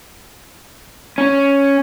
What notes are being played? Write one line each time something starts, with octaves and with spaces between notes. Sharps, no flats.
C#4